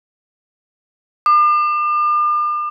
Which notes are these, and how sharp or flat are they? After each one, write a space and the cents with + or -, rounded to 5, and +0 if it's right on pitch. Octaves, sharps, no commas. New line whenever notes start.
D6 +40